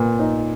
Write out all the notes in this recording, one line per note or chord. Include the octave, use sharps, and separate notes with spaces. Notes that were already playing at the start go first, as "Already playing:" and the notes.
Already playing: A#2 B3
D#4